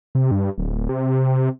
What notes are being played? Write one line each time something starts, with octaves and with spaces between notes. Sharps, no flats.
C3
G2
D1
C3